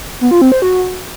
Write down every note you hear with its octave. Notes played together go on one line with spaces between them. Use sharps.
B3
F4
C4
C5
F#4